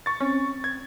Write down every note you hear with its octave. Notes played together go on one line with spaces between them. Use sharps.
C#6 A6
C4 C#4
G#6